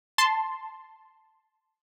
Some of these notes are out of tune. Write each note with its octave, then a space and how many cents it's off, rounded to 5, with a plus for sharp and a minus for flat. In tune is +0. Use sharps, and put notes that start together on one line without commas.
A5 +0 C6 +0